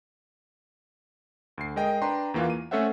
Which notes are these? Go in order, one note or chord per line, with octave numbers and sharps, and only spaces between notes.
D2 C7
G#3 A#4 D#5 G5
D4 B4 G5 A#5 C6
E2 E3 A#3 F4 F5
D#7
A3 C#4 A4 C5 E5 F#5